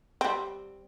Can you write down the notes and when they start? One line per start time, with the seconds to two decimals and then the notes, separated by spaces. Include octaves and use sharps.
0.21 G3 C4